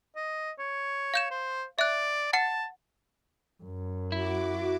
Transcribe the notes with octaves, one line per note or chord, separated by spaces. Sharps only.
D#5
C#5
F5 G6 E7
C5
D5 E5 F#6
F#5 A5 A6 C#7
F#2
E4 F#4 D6